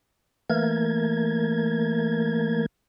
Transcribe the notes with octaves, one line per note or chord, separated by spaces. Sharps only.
E3 A3 A#3 A#4 G#6